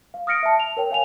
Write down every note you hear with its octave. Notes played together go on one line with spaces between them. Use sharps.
F5
D#6 F6 A#6 C#7 D7
E5 A5
F7
A#4 C#5 G5
C#5 F5 G#5 F7